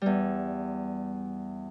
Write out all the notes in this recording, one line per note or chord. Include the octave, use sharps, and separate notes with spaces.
E2 G3